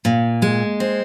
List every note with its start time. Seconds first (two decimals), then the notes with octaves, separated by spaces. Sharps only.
0.05 A#2
0.42 G#3
0.80 C4